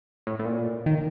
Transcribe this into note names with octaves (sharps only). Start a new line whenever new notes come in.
A2
A2
A#2
D#3